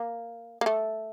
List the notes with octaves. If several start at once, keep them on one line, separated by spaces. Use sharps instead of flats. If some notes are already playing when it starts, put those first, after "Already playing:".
Already playing: A#3
A#3
A3